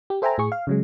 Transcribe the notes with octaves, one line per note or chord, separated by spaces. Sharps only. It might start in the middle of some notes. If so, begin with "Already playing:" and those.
G4
A4 C5 E5 G5 G#5 A#5
A2 G#4 C#6
F5
C#3 F#3 G#3